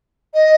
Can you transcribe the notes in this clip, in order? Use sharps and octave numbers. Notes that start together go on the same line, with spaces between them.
D#5